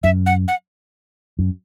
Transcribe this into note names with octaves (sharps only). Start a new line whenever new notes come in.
F#2 E5
F#5
F#5
F#2